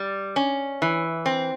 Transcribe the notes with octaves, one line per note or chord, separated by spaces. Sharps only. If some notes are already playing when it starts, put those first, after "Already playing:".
Already playing: G3
C#4
E3
C4